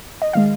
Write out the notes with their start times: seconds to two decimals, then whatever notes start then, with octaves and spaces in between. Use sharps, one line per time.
0.22 D#5
0.33 D#3 G#3 F5